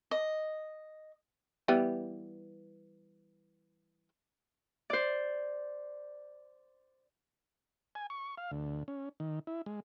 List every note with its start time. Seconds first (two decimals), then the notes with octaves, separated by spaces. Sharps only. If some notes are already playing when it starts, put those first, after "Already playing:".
0.11 D#5
1.68 E3 G3 B3
4.90 C5 D5
7.95 G#5
8.10 C#6
8.38 F5
8.51 D2
8.88 C#4
9.20 D#3
9.47 E4
9.66 G#3